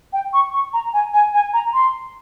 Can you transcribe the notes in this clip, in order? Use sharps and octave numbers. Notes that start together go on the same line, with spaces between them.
G5
C#6
C#6
A#5
G#5
G#5
G#5
A#5
C6